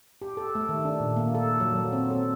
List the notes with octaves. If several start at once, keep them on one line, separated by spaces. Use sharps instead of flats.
G4
A4
A3
D#3
D4
A#2
A#3
A4
F#3
F#3
C4
A4